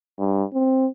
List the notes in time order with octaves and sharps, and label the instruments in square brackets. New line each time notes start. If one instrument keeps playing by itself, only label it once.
[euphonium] G2
C4